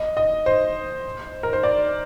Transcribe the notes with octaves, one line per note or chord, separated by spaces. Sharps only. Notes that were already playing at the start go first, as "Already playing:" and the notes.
Already playing: D#5
D#5
C5
A#4
C5
D5